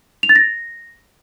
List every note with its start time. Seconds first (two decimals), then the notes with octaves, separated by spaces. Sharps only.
0.23 F7
0.29 A6
0.36 A#6